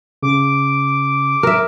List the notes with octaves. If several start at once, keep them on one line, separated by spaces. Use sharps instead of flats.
C#3 D6
A#4 E5